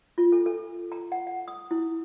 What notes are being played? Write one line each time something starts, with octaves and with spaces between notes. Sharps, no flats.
F4
A4
A4
A#5
F#5
F#5
D#6
E4